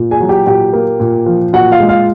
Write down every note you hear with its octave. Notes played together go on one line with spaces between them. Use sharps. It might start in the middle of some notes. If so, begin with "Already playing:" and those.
Already playing: A#2
G#4 G#5
F#3
G4 G5
A#2 G4 G5
A#3
A#2
F3
A#2 F#4 F#5
F4 F5
G#3
F4 F5